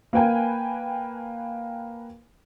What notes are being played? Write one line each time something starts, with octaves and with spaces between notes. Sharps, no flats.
A#3 B4 G5 G#5